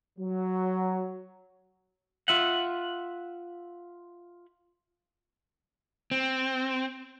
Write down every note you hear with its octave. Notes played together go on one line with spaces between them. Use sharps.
F#3
F4 E5 F#5
C4